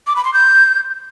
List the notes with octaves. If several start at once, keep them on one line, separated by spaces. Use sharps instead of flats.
D6
B5
C6
G6